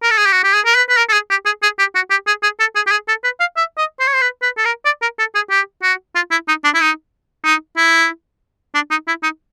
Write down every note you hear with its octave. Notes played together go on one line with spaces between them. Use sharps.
A#4
A4
G#4
G4
F#4
G4
G#4
A#4
B4
B4
A#4
A4
G#4
G4
G#4
G#4
G4
F#4
G4
G#4
G#4
A4
G#4
G4
G#4
A4
B4
F5
E5
D#5
C5
C#5
C5
B4
B4
A4
A#4
D5
A#4
A4
G#4
G4
F#4
F4
E4
D#4
D4
E4
D#4
D#4
E4
D4
D#4
E4
D#4